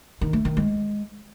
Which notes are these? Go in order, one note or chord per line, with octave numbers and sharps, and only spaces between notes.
D#3
A3
D#3
G#3